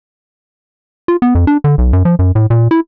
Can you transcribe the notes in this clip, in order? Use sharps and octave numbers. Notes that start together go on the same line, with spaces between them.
F4
B3
F2
D4
D3
B1
F#2
F3
F#2
A2
A#2
E4